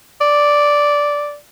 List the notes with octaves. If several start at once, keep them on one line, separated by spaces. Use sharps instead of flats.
D5